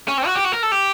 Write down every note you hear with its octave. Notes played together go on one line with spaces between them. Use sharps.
C#4
C4
F#4
G4
F#4
A#4
A4
G4